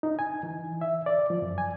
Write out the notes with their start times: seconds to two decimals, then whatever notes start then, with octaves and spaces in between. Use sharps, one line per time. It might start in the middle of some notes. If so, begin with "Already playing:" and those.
0.03 D#4
0.19 G#5
0.43 E3
0.81 E5
1.06 D5
1.30 F3
1.42 F#2
1.58 G#5